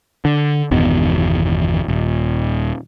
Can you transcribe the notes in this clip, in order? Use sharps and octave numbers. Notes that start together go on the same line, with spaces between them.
D3
G1 E2 B2 D#3
D#1